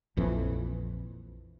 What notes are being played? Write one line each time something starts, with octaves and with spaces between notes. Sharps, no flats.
A#1 F2 E3